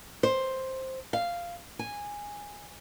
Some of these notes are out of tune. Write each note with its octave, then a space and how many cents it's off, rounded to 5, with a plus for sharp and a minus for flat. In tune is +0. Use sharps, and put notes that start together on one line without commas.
C5 +5
F5 -10
G#5 -10